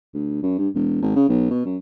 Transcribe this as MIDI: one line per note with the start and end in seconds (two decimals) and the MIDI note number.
0.14 0.41 38
0.42 0.57 42
0.59 0.69 43
0.75 0.99 28
1.02 1.15 32
1.16 1.28 49
1.29 1.48 35
1.50 1.60 47
1.65 1.77 42